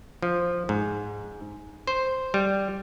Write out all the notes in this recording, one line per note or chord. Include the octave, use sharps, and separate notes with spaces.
F3
G#2
C5
G3